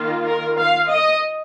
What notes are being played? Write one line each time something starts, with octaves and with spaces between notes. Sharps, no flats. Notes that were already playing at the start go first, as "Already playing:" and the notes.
Already playing: D#3 A#3 F4
A#4
F5
D#5